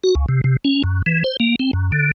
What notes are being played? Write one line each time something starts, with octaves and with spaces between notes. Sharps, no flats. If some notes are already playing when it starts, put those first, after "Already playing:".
F#4
C#2
C3
C3
C#4
F#2
E3
C5
A#3
C4
F#2
D3